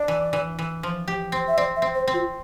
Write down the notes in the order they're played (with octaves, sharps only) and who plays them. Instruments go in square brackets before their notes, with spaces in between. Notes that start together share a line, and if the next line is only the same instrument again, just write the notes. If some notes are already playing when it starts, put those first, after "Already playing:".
Already playing: [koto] D4 [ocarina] D5
[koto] E3
E3
E3
F3
G4
C4
[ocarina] E5
[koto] C4 [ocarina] D5
[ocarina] E5
[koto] C4
[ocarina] C5
[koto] C4
[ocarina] F4